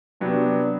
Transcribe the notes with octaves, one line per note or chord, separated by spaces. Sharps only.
C3 F#3 B3 D4 G4